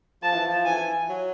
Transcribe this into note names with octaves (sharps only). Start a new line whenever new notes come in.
F3 A5
E3
F3
E3 G#5
F#3